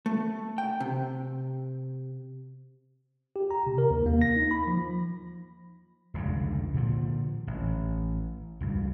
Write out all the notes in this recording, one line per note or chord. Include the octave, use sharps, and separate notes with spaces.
A3
G5
C3
G4
A#5
C3
A#4
D#2
A#3
A#6
D#4
B5
F3
F1 C#2 G2 D3
A#2 D3 F3
A1
C#2 G2